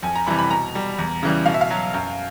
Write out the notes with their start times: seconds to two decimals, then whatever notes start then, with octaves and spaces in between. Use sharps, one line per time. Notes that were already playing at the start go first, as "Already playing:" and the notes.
0.03 F2 G#5
0.16 A#5
0.27 C3 E3 G3 B5
0.39 B5
0.50 B2 A#5
0.75 G3
0.99 E2
1.23 C#3 E3 G3
1.46 B2 F5
1.54 E5
1.61 F5
1.70 F#3
1.94 F#2